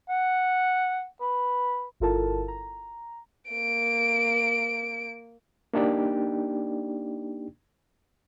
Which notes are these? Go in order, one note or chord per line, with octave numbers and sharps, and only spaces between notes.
F#5
B4
G1 E4 F4 A4 A#4 A5
A#5
A#3 D7
A#3 D4 D#4 G4 D5 G5